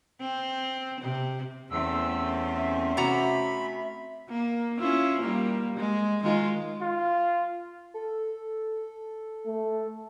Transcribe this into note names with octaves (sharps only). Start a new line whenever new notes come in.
C4
C3
E2 A3 C4 C#4 E6
E5
C3 F#4 A#5 B5
A#3
C#4 E4 F4
G3 A#3
G#3
D#3 G#3 F4
F4
A4
A3